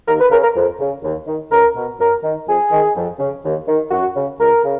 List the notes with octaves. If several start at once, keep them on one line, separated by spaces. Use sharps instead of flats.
D#2 A#4
B4
C#3 A#4
A#4
F2
C#3
D#2
D#3
C#2 A#4
B2
F#2 A#4
D#3
F2 G#4
D#3
F2
C#3
D#2
D#3
F#2 F#4
C#3
C#2 A#4
C#3